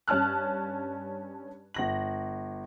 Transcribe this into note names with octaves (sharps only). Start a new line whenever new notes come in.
G2 C#4 A5 F6 F#6
G1 A#6 F#7